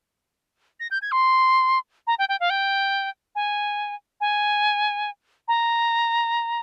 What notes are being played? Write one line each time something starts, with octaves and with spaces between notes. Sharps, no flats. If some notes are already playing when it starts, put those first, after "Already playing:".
A#6
G6
G#6
C6
A#5
G5
G5
F5
G5
G#5
G#5
A#5